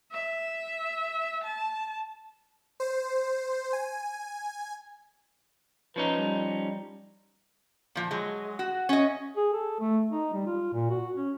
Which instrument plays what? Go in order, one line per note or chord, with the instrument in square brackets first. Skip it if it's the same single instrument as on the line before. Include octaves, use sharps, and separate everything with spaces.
[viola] E5
A5
[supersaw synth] C5
G#5
[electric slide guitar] F3 C#4 D#4 [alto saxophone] B4
[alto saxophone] G3
[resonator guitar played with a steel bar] A#2 F3
F#3 G#3
F#4
C#4 D#5
[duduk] G#4
A4
A3
D#4
G3
F4
A#2
F#4
C#4